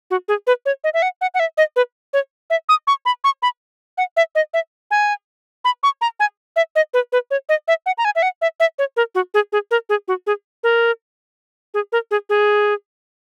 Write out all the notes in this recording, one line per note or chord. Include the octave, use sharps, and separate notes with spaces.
F#4
G#4
B4
C#5
D#5
E5
F#5
F#5
F#5
E5
D#5
B4
C#5
E5
D#6
C#6
B5
C#6
B5
F#5
E5
D#5
E5
G#5
B5
C#6
A#5
G#5
E5
D#5
B4
B4
C#5
D#5
E5
F#5
A#5
G#5
E5
F#5
E5
E5
C#5
A#4
F#4
G#4
G#4
A#4
G#4
F#4
G#4
A#4
G#4
A#4
G#4
G#4